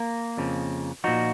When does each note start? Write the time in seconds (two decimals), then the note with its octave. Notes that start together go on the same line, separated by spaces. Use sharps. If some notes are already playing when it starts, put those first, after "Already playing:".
Already playing: A#3
0.37 F2 C#3 F3
1.04 A#2 F3 D#4 F#4